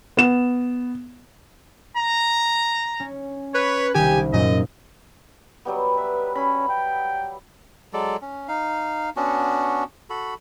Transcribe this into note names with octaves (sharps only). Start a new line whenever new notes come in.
B3 E7
A#5
C#4
B4 C#5
C2 D#3 G4 G#5
F#2 A#2 D#5
F#3 G3 B3
B4 E5
C#4 B5
G5
F#3 G#3 A4 D5
C#4
D#4 F5
B3 C#4 D4 F#4
F#4 A4 B5